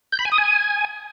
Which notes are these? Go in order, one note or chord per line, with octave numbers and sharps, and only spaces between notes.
G6
B5
G#5
D#6
G#5